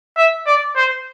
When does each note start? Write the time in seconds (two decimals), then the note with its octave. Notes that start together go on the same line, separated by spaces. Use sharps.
0.17 E5
0.46 D5
0.76 C5